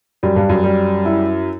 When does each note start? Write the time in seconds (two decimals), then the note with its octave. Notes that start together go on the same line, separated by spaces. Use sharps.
0.23 F#2 G3
0.36 G2
0.49 F#2
0.64 G3
1.05 E4